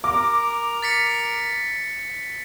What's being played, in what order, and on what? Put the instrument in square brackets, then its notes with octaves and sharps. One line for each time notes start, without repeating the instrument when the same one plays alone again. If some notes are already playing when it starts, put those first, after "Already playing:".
[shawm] A#4 [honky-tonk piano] D6
[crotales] A6 B6 C#7